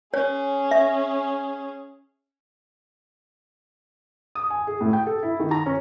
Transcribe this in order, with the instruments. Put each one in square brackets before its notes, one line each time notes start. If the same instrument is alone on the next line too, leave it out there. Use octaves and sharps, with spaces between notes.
[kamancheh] C#4 G#4 [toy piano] C#5
[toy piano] E5
[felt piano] D#6
G#5
G#4
A2
G5
A4
E4
D#3
A#5
C#4